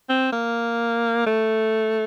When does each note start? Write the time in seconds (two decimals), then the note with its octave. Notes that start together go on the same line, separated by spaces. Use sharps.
0.09 C4
0.33 A#3
1.26 A3